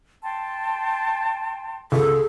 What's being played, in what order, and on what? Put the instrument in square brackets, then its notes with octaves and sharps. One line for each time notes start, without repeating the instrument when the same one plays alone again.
[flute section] G5 A5 C6
[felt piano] C#2 [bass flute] G#4 [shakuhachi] A4